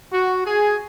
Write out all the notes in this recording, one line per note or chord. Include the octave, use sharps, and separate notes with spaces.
F#4
G#4